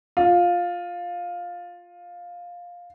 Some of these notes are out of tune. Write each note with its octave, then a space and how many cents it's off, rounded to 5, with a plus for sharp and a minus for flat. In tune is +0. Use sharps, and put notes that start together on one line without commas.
F4 +10